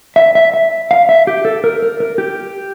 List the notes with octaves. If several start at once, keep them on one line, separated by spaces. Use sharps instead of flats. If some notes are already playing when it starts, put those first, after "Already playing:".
E5
E5
E5
F5
E5
G4
A4
A#4
A#4
A#4
G4